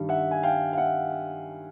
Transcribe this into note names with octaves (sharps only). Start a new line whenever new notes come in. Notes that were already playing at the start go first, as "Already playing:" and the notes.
Already playing: G2 D#3 G3
E5 F#5
G#5
F5 G5
F5
E5 F#5